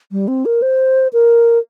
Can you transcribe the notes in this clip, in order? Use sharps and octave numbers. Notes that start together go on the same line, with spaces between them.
G3
C4
A#4
C5
A#4